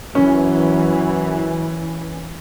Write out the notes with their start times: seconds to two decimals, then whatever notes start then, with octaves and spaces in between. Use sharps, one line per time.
0.15 F#2 E3 C#4